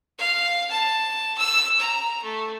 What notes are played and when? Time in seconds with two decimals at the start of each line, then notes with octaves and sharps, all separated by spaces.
0.19 F5
0.71 A5
1.38 E6
1.79 A#5
2.23 A3